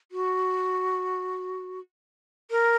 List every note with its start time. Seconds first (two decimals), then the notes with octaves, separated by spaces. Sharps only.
0.12 F#4
2.51 A#4